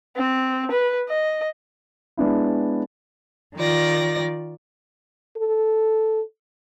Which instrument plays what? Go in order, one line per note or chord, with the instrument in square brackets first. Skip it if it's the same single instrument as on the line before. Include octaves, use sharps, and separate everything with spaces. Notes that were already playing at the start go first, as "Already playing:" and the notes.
[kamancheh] C4
B4
D#5
[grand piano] G#3 B3 D4 E4
[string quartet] D#3 F4 D5 A#6
[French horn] A4